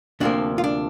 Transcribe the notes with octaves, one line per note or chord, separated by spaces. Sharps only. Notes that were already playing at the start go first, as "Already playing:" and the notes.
D2 C3 F3 A#3 D4
F4
D4